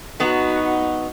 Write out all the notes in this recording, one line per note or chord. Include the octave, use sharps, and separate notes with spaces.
F#3 B3 D#4 F#4